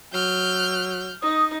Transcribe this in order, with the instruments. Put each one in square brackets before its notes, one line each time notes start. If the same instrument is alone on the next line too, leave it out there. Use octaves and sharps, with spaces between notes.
[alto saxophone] F#3 [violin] F6 G6
[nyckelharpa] D#4 [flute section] D#6